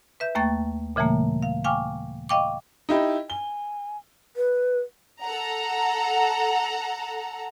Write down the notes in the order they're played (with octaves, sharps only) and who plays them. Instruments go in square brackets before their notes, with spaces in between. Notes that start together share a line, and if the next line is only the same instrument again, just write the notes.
[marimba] B4 E5 G6
D#2 A3 A#3 G5 C#6 A6
A#2 C#3 E3 G3 A3 A#3
F5
F5 G5 G#5 C#6 D6 F6
D#5 F5 G5 C#6 D6
[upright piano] D#4 E4 G4
[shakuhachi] G#5 [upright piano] G7
[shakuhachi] B4
[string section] A4 F#5 A#5